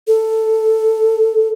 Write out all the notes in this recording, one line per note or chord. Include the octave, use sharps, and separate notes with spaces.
A4